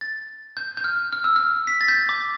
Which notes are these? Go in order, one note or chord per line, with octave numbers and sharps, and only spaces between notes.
A6
G6
G6
F6
F6
E6
F6
B6
A6
G6
A6
D6